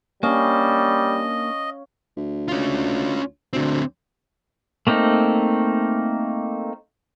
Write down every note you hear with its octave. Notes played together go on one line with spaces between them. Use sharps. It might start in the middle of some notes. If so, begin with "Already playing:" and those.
G3 A#3 C#4 D4 D#5 F5
D2
C#4 F4
D2 D3 C4
A3 A#3 C4 D#4